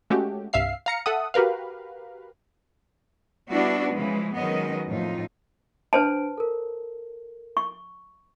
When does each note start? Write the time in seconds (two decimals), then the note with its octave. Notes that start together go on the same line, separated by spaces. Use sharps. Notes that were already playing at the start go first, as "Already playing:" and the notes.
0.10 G#3 A3 C#4 F#4 G4
0.53 C2 G2 E5 F5 C7
0.86 F5 A#5 C#7
1.06 A4 E5 F#5 D#6
1.34 F#4 G4 A#4 B4 F5
3.49 G3 B3 D4 E4 F#4
3.94 C#3 E3 F3 G#3
4.36 D#3 F#3 G#3 B3 C#4 D#5
4.89 F2 A2 D#4 F4
5.93 D4 B4 C5 A5 D7
6.38 A4 A#4
7.57 C#6